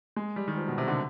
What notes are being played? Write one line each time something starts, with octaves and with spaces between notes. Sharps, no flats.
G#3
G3
D#3
F3
B2
C3
D3